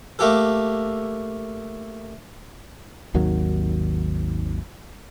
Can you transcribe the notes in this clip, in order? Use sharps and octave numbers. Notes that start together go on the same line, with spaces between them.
A3 A#3 G4 A4
G#1 D#2 D#3 F#3